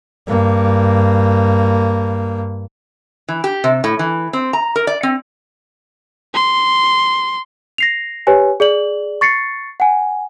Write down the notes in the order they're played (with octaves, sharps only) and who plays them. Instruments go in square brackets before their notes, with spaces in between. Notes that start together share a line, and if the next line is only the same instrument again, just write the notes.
[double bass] G2 A#3
[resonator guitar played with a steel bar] E3
G4
C3
A2
E3
C4
A#5
A#4
D5
C4
[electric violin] C6
[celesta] A#6 C7 F7
G4 B4 C#5 G#5
G#4 D5 F#7
C#6 A6 C7 C#7
F#5 G#5